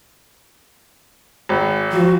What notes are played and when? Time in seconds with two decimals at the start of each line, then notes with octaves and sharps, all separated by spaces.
1.49 G#1
1.92 F3 F#4